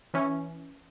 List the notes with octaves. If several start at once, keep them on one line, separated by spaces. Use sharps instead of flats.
E3 C#4